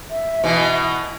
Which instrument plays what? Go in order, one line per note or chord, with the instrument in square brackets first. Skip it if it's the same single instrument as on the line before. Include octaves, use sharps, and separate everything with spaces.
[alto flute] E5
[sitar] B2 E3